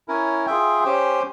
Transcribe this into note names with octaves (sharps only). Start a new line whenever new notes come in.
C#4 E4 A#4 C#5
F4 G#4 E5 G5
C#4 G4 C5 G5